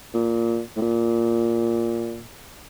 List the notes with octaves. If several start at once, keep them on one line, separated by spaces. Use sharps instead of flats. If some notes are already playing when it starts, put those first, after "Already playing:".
A#2
A2
A#2